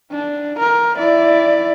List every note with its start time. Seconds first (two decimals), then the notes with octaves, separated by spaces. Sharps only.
0.11 D4
0.59 A#4
0.97 E4 D5